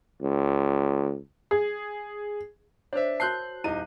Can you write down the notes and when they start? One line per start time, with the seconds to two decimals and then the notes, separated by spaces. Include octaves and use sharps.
0.22 C#2
1.51 G#4
2.93 D4 C5 C#5 E5
3.20 F#4 A#4 A5 F#6 G6 C7
3.64 D#1 D#4 E4 D#7